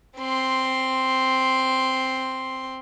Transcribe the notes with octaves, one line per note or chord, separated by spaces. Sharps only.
C4 C6